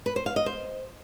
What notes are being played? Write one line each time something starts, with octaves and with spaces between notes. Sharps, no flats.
B4
C5
F5
D#5
C5